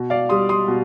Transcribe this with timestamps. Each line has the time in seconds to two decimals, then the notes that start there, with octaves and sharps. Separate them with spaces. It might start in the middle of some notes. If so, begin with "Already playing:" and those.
Already playing: B2
0.10 D5 F5
0.29 G3 C6 D#6
0.49 C6 D#6
0.68 B2